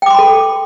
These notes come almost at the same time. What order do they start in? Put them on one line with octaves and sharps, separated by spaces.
G5 D6 C6 B5 A4